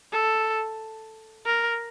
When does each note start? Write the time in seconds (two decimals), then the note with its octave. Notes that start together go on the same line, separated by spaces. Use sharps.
0.13 A4
1.46 A#4